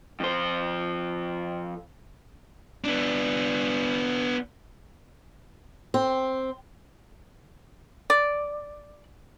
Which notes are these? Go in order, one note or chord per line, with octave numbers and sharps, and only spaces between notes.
F2 C5
B3 D4
C4
D5